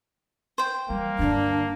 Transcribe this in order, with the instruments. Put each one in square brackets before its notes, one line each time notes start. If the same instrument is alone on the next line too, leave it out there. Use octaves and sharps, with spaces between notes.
[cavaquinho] C5 G5
[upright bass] E3 G3 [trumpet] A#3
[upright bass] G2 D3 [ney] D4